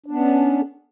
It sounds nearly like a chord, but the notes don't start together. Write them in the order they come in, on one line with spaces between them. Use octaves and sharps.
D4 B3 C#4